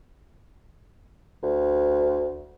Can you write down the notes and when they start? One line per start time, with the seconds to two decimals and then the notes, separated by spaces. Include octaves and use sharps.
1.43 D2